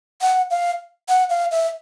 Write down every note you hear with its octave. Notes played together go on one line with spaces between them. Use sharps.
F#5
F5
F#5
F5
E5